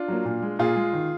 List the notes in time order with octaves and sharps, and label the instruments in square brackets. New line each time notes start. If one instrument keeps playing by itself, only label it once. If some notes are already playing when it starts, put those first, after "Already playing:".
Already playing: [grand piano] D4 F4
F#3 A#3
A#2
G#3
A#2 F4 G#4
G#3
D#3